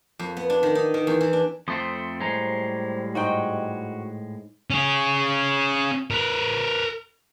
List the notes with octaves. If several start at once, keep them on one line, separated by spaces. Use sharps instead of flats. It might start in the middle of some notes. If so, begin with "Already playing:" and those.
F2
B3
D4
D#3
D#4
D#3
E2
E3
D4
F2 A3 C4 C6 D#6
A2 G3 G#3 C5 A#5
G#2 D#4 F#4 G5
C#4 G#4
A#4 B4